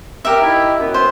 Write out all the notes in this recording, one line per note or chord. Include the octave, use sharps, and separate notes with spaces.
G4 A#4 E5
D#4 E4
F#2 B3
C5